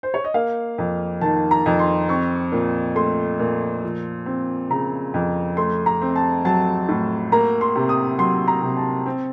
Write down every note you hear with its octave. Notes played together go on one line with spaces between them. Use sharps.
C5
C#5
D#5
A#3 F5
F2
D#3 A5
A#5
F2
C6
C4 C#6
A#2
A3 C6
A#2
F3
C4
C#3 A#5
F2
A3 C6
A#5
C4
A5
F#3 A5
A2
A#3 A#5
C6
C3
D#6
F#3 C6
A#5
C3
A5
C4